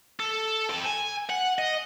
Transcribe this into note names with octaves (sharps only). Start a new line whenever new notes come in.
A4
C4 A5
G#5
F#5
D#5